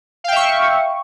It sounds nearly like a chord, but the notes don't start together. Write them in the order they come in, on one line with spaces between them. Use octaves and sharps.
F5 G5 E5 C#6